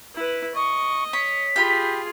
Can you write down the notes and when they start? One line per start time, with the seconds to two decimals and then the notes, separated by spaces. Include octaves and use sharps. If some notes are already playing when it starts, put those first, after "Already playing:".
0.15 E4 B4
0.55 D#5 C#6
1.13 C#5 B6
1.56 F4 G4 G#4 B5